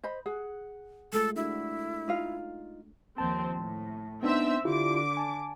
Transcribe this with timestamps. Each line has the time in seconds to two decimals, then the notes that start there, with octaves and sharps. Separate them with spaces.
0.04 C5 D#5 B5
0.26 G#4 F#5
1.13 G#3 A3 F4 A4
1.36 D4 E4 F#4
2.08 D#4 F4 F5
3.18 D#2 F3 C4 A5
3.56 A2
4.23 B3 C4 D4 D#4 E5 E6
4.65 D3 E4 F4 G4 D6
5.17 G#5 A5